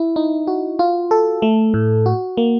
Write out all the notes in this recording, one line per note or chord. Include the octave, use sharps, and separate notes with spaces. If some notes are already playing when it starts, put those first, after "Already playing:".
Already playing: E4
D#4
F#4
F4
A4
A3
A2
F#4
A#3